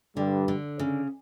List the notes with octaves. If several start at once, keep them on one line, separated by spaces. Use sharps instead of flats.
G2 D3 G3
D3
C#3